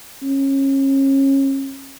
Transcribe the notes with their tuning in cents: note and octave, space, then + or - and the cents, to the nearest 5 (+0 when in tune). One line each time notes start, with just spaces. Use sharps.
C#4 -30